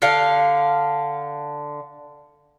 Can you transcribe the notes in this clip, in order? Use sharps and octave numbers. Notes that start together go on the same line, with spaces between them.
D3 F5